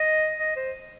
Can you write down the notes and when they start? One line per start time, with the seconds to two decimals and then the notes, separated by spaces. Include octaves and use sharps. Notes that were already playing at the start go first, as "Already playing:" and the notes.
Already playing: D#5
0.39 D#5
0.56 C5